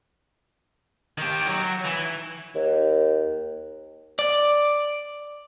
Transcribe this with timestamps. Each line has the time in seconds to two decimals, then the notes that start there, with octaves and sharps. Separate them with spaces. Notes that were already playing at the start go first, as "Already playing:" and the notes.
1.18 D#3 G4
1.48 F#3
1.85 E3
2.56 D#2
4.19 D5